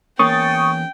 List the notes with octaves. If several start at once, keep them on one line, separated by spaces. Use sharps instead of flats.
E2 A#3 C#4 G5 C#6 D#6 A6